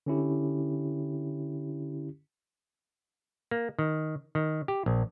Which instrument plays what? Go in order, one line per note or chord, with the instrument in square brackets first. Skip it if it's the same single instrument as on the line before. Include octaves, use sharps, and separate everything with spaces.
[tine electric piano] D3 C#4 E4 G4
[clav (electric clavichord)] A#3
D#3
D#3
G4
A#1